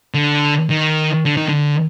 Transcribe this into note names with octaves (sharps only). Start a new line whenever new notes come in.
D3
D#3
D3
D#3
D3